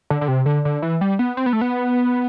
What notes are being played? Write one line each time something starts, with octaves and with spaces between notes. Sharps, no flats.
D3
D3
C3
D3
D3
E3
G3
B3
C4
B3
A3
B3